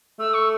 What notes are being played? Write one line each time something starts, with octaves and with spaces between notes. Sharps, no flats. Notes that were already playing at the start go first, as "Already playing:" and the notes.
A3 E6
C#6